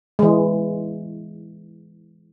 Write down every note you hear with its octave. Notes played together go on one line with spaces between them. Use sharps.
E3 G#3